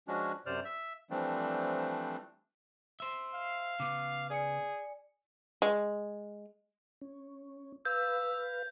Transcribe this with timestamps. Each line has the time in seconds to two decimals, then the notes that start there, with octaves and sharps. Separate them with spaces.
0.08 F3 G#3 C#4 D4 F#4
0.46 F#2 C3 C5 D5 F6
0.65 E5
1.10 E3 F3 G3 A3 C4 D4
3.00 C5 E5
3.34 F5
3.80 C#3 B3 D6
4.30 G#4 D5 G#5 C#7
5.62 G#3
7.01 C#4
7.85 B4 F5 E6 G6